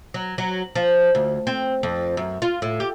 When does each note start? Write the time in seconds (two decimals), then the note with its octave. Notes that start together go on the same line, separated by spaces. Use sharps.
0.14 F#3
0.38 F#3
0.75 F3
1.15 D2
1.47 C4
1.83 F2
2.17 F#2
2.42 F4
2.62 A2
2.80 G4